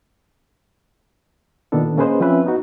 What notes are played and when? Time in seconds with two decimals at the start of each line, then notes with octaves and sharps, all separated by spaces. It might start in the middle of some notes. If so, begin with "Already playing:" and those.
1.72 A#2 D#3 B3 D4 A4
1.97 A#3 C#4 G#4 B4 C5 D#5
2.20 F3 C4 C#4 B4 E5
2.44 B3 D#4 F#4